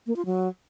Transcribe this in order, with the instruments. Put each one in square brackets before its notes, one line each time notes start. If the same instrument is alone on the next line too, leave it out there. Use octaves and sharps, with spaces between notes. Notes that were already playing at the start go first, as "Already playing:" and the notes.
[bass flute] A#3
F4
F#3